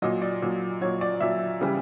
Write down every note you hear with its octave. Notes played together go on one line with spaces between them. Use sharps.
A#2 F#3 D#5
D5
A#2 F#3
A#2 F#3 C#5
D5
A#2 F#3 E5
C#3 E3 G3